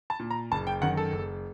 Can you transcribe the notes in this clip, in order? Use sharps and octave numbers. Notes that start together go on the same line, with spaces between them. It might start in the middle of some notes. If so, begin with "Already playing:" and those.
A5
A#2
A#5
F#1 A5
G5
F#2 D#3 F#5
A4
F#1